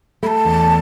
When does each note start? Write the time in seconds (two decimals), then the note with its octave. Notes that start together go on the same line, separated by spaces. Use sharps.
0.23 A3 B5
0.27 A5
0.45 E2